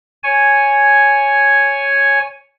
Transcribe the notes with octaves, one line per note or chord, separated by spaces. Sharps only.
C#5 G#5